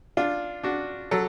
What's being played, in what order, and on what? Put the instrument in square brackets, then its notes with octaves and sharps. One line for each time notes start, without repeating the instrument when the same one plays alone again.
[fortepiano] D4 F4
D4 F#4
F#3 A4